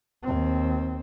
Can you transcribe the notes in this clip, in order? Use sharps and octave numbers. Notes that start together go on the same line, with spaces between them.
D#2 C4